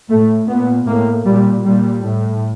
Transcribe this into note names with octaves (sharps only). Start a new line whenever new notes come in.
A2 A3
A#2 B3
A2 A#3
A#2 G3
A#2 G3
A2